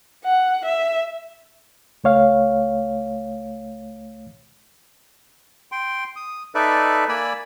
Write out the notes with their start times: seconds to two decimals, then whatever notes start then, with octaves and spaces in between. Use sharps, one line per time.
0.24 F#5
0.65 E5
2.04 C#2 A3 C#5 F5
5.72 G5 C6
6.16 D#6
6.55 D#4 A4 B4 D5 E5
7.09 A#3 D5 G#5 B5 E6